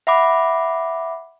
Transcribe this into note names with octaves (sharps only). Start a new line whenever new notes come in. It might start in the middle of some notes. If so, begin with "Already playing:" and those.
E5 F#5 B5 D6